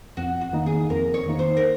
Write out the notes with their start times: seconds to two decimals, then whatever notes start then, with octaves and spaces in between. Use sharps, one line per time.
0.17 F2 F#4
0.41 F#4
0.53 D#3 A#3 D#4
0.66 G#4
0.90 F2 A#4
1.14 C#5
1.26 D#3 A#3 D#4
1.39 C5
1.57 A#4